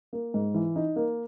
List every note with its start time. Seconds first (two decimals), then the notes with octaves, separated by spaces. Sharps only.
0.13 A#3
0.34 G#2
0.54 E3
0.76 D#4
0.96 A#3